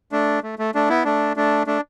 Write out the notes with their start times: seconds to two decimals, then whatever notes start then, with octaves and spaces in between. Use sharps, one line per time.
0.12 A3 D4
0.43 A3
0.59 A3
0.75 A3 D4
0.89 B3 E4
1.05 A3 D4
1.37 A3 D4
1.67 A3 D4